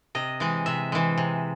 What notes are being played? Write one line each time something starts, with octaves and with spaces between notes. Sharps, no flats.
C3 D#5
E3 G#3
C3 E5
E3 G#3
C3